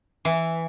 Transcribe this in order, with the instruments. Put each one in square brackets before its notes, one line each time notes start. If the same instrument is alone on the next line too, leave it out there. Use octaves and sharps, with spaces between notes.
[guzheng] E3